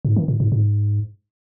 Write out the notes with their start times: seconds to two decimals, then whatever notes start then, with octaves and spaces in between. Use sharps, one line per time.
0.05 G#2
0.16 D#3
0.28 A2
0.40 G#2
0.52 G#2